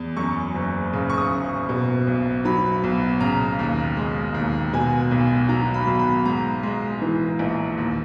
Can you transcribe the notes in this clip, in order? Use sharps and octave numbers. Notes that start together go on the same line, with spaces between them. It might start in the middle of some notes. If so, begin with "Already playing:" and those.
Already playing: E2
F#2 C#6
F#1
C#3
C#6
D#6
F#1
B2
B1
F#3 B5
B1
C#3 A#5
D#2
G#3
D#2
B2 G#5
B1
F#3 A#5
B5
B1
B5
G#2 A#5
G#3
E3
A#1
D#2